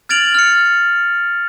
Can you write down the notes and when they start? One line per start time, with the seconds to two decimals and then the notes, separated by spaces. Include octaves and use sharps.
0.09 F6 G#6 A6 D7 F7 F#7
0.35 F6 C#7